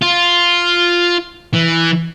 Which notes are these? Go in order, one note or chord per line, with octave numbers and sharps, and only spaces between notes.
F4
E3